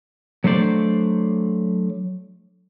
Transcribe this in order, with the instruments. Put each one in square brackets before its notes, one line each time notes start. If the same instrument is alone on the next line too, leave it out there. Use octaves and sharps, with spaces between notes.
[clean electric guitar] F#3 A3 D4 C5 D5